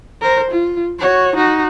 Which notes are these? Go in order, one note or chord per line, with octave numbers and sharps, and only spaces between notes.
A#4 C5
F4
F#4 C#5
D#4 F#4